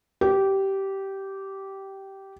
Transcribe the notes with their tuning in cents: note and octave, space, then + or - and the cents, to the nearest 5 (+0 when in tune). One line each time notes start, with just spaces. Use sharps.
G4 -15